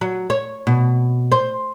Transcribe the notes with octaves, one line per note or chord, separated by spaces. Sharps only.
F#3
C#5
B2
C5